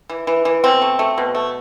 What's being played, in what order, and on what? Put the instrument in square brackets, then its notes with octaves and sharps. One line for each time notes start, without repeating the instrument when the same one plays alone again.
[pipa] E3
E3
E3
B2 C4
A3
A3
B2
A3